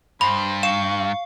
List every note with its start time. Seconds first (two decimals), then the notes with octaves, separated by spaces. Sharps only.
0.21 G2 C5 B5
0.63 F5 C#6 E7